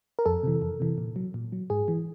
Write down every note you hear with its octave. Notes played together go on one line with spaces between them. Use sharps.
A#4
F2 A4
C3 E3
F2
C3 E3
A#2
F#3
A#2
F#3
G#2 G#4
E3